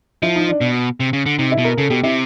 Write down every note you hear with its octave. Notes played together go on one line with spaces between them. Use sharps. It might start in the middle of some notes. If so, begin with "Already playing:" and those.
F3 E4
D#4
D4
B2
C3
C#3
D3
C3 D#4
E4
B2
A#4
C#3 A4
B2 G4
C3 E4